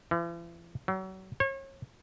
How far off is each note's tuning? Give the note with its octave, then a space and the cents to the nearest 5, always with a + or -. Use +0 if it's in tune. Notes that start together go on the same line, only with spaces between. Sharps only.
E3 +45
F#3 +35
C#5 -35